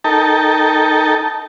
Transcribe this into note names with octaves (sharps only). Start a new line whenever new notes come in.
D#4 A4 A#4 G5 A5